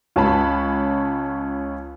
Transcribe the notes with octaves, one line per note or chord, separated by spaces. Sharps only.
C#2 C#4 A5 B5